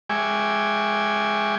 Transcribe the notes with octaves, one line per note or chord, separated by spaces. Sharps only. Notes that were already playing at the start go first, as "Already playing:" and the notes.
G#3 E5 G5 G#5 C#6 D6